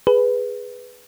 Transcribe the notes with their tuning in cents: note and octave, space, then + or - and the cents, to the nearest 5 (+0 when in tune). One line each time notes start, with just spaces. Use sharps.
G#4 +0 B4 +0